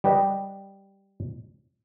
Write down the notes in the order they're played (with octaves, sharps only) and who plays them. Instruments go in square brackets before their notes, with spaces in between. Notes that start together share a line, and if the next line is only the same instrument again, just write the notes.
[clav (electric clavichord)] G3 G4 B4 D#5